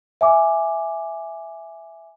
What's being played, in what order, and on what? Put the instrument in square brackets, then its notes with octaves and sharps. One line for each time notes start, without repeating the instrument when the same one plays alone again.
[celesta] E5 G#5 D6